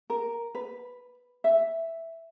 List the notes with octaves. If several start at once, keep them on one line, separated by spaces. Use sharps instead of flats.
A#4
B4
E5